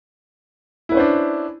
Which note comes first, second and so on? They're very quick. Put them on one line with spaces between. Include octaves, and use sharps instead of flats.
E4 B4 C#4 C5 D4